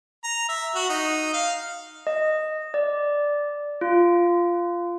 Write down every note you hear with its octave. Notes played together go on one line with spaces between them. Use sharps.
A#5
E5
F#4
D#4
F5
D#5
D5
F4